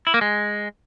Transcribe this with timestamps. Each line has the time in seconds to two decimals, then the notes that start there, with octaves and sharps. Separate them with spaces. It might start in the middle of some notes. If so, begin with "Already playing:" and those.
0.07 E4
0.14 A#3
0.21 G#3